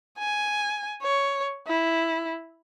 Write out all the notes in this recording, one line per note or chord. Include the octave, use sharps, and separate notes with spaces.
G#5
C#5
E4